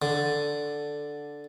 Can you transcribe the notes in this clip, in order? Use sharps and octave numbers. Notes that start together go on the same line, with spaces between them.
D3